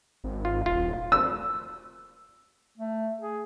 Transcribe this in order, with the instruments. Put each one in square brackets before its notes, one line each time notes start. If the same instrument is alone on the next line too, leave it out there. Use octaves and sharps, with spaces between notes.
[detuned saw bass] G#1
[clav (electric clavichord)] F4
[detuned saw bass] D#1 [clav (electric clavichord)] F4
[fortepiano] E6
[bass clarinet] A3
G#4